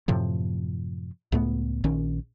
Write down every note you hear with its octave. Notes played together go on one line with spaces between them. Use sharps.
F#2 A2 C3 F3
C#2 A2 A3 B3
A#1 D#3 C#4